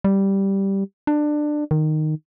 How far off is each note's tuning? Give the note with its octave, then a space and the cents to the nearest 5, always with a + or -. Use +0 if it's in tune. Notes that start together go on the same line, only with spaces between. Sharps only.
G3 -5
D4 +20
D#3 -10